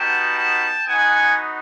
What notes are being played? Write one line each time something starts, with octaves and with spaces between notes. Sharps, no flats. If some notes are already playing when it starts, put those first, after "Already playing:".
Already playing: G3 B3 D#4 F#4 G5 A5
G5 A5
B3 D#4 F#4 F#5 G#5